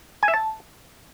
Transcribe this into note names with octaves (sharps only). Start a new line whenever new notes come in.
G#5
E5
A5